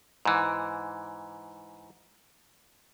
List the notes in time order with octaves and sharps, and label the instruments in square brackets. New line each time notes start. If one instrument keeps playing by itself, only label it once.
[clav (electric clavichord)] G#2 E3